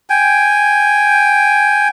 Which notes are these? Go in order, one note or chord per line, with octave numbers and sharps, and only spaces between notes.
G5 G#5